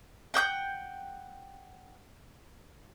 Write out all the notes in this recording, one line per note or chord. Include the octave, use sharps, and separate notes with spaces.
F#5 G5 D6 G6